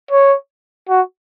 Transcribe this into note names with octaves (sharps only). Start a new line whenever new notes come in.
C#5
F#4